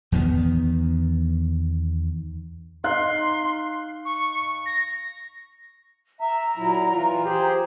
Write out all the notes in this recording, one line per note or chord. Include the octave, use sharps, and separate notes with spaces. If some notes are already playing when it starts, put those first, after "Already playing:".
E2 D#3 B3
D#4 F5 C6 F#6
C#6
A#6
E5 A#5
A#2 F#3 E4
E3 F4
G4 G#4 C5